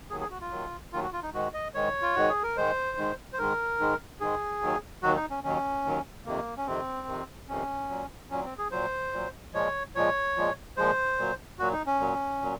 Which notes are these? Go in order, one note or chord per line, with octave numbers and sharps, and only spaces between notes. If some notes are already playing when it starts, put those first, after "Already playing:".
D#2 D#3 F#3 G#4
G#4
F#4
F4
D#2 D#3 F#3
D#2 D#3 F#3 F4
F#4
F4
D#4
G#2 D#3 G#3 F#4
D#5
G#2 D#3 G#3 C#5
F4
G#2 D#3 G#3 F#4
G#4
A#4
G#2 D#3 G#3 C5
G#2 D#3 G#3
C5
G#2 D#3 G#3 A#4
G#2 D#3 G#3
G#2 D#3 G#3 G#4
D#2 D#3 F#3
D#2 D#3 F#3 F#4
D#4
C#4
D#2 D#3 F#3 C#4
D#2 D#3 F#3
F2 C3 D#3 A#3
C#4
F2 C3 D#3 C4
F2 C3 D#3
F2 C3 D#3 C#4
A#2 F#3
A#2 F#3 C#4
C4
G#4
A#2 F#3 C5
A#2 F#3
A#2 F3 G#3 C#5
A#2 F3 G#3 C#5
A#2 F3 G#3
A#2 F3 G#3 C5
A#2 F#3
A#2 F#3 F#4
D#4
C#4
A#2 F#3
A#2 F#3